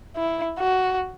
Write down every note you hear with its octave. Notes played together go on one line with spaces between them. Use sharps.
E4
F#4